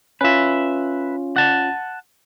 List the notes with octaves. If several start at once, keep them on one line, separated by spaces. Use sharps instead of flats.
C#4 F4 B4 E5
F#5 A5